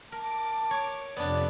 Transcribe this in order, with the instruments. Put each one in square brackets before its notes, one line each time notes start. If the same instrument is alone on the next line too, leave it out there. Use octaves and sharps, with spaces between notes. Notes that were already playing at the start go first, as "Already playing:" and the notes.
[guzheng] A#4 [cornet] A5 [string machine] D6
[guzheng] C#5
[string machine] F2 C3 [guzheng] B3 D4 [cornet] D5